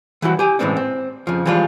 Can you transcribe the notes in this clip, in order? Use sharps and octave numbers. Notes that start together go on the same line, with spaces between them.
E3 G3 E4 F#4
G4 G#5
A2 C#3 E3 G#3 C4 D4
C4
F2 C#3 F3
E3 F3 G3 G#3 F4